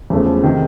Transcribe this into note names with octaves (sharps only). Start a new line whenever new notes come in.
E2 C#3 F3 A3
C3 D#3